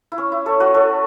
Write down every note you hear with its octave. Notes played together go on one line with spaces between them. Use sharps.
E4
C#4
E4
A4 C#5
F#4 B4
A4 C#5